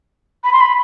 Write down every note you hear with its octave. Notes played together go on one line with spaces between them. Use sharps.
B5
C6
B5